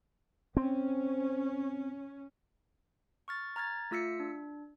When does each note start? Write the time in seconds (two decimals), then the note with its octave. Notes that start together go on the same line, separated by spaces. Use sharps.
0.57 C4 C#4
3.28 C#6 F6 A6
3.56 A#5 F6 G#6 A6
3.91 A3 F4 E6 B6 C#7
4.20 D4